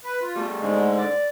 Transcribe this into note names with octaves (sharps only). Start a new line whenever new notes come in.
B4
F4
G3 A3
G#2 D3 G#3
D5